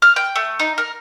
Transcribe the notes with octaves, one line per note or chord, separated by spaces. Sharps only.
F6
G5
A3
D#4
A#4